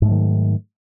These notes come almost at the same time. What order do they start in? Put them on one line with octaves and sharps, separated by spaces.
G#2 A3 F#3 D#3